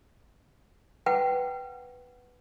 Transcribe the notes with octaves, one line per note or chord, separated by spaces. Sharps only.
B4 F#5 G5